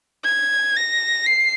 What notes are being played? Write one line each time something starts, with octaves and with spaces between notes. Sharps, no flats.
G#6
A#6
C7